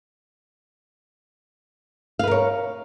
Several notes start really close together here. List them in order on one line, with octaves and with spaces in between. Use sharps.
F5 B4 A#4 C#5